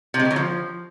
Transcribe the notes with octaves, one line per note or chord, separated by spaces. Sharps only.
C3
G#3
B2
F#3
F3